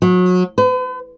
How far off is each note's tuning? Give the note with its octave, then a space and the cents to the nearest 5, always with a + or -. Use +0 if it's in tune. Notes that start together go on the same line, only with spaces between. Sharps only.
F#3 -30
B4 +45